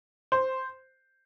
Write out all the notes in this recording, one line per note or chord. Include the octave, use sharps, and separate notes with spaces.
C5